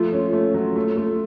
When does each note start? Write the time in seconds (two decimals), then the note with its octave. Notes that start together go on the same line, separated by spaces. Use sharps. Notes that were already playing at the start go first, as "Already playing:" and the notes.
Already playing: F3 A3 F4
0.13 C#4
0.33 A3
0.54 F#3
0.76 A3
0.97 A3